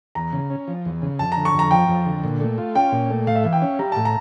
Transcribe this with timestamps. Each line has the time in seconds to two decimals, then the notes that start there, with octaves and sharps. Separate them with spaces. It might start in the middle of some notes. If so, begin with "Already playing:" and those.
0.15 E2 A#5
0.33 C#3
0.50 C#4
0.68 F3
0.85 E2
1.02 C#3
1.19 F2 A5
1.32 A#5
1.37 D3
1.45 C#6
1.54 F2 A#5
1.71 F3 G5
1.88 F2
2.06 D3
2.24 A#2
2.41 A3
2.58 F4
2.75 C#4 G5
2.92 A#2
3.10 A3
3.27 A2 F5
3.35 E5
3.44 E3 F5
3.53 G5
3.62 C#4
3.79 G3 A#5
3.92 A2 A5
4.05 A#5